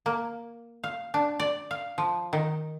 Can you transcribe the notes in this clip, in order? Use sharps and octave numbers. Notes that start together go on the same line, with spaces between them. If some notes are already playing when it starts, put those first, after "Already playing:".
A#3
F5
D4
D5
F5
F3
D#3